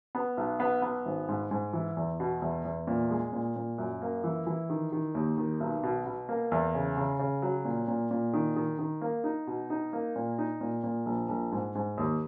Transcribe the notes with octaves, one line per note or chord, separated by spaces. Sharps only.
B3
B1
B3
B3
G#1
G#2
G#2
E3
E2
B2
E2
E2
A#2
G#3
A#2
A#2
F#2
A#3
E3
E3
D#3
D#3
D#2
D#3
B1
B2
B2
A#3
E2
C#3
C#3
C#3
F#3
A#2
A#2
A#2
D#3
D#3
D#3
A#3
D#4
B2
D#4
A#3
A#2
D#4
A#2
A#2
A#1
A#1
G#2
G#2
D#2